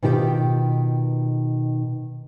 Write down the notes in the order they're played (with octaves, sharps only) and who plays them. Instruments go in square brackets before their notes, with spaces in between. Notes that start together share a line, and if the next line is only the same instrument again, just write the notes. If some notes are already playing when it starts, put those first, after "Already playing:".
[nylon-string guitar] B2 D#3 F4 G4 D#5 G5